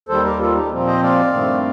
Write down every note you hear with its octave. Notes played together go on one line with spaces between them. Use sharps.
D#2 D#3 G3 A4 C5
G4 A#4
F4 A4
D#4 G4
A#2 F3 C4
C5 D#5
D5 F5
G2 D#3 A3 C4